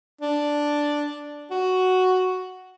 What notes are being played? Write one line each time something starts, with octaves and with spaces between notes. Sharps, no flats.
D4
F#4